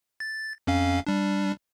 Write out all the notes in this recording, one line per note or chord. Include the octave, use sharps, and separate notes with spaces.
A6
F2 C#4 F5
G3 D4